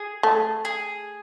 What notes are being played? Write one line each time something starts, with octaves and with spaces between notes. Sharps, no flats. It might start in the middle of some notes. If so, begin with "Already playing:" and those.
Already playing: G#4
A3
G#4